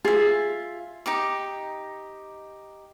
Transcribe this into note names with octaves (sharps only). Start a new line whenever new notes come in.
F4 G#4 E5
D#4 G4 D6